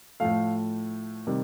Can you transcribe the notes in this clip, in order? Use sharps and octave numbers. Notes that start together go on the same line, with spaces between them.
A2 F3 A3 F5
C3 D#3 G3